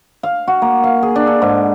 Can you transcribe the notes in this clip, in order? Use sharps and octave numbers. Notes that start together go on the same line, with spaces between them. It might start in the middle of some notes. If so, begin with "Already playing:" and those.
F5
F#4
A#3
F5
G#4
D4
A4
G#2